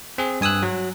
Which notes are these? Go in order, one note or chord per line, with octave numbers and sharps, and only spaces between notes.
C4 G#4
G2 G#5 D#6 E6 F#6
F#3